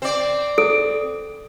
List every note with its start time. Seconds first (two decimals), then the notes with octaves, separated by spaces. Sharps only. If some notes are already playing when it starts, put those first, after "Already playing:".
0.02 C4 D5
0.58 A4